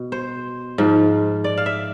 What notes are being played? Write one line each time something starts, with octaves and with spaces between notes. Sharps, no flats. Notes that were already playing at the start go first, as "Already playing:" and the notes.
Already playing: B2
C5
G#2 F3
D5
F5
E5